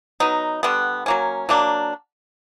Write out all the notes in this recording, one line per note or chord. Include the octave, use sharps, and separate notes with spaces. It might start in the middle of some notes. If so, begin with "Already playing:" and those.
F#3 B3 D#4
D3 G3 B3
F#3 A#3 C#4
F#3 A#3 D4